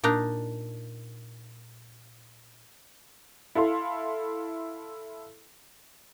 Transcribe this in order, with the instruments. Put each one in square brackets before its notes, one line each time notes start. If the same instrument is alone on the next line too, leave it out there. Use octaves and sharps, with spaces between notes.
[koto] A#2 D4 D#4 A#5
[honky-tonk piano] E4 A4 F5 C6